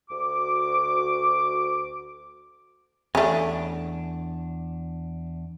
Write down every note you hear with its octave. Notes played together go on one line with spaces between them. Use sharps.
D2 F#4 D6
E2 A3 C#4 D4